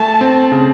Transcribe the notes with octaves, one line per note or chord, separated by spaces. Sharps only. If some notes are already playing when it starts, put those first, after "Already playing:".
Already playing: A3 A5
C4
C#3